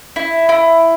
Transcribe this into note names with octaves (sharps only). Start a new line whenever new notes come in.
E4
E4